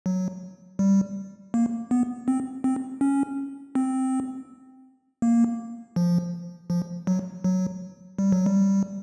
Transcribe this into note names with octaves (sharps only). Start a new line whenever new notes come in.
F#3
G3
A#3
B3
C4
C4
C#4
C4
A#3
F3
F3
F#3
F#3
G3
F#3
G3